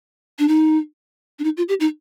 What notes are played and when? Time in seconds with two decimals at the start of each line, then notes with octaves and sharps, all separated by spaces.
0.39 D4
0.48 D#4
1.39 D4
1.44 D#4
1.57 F4
1.69 G4
1.80 D#4